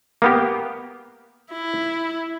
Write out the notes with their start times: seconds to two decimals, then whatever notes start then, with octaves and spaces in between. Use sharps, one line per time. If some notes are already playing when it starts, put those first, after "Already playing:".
0.22 A#3 B3 G4
1.52 E4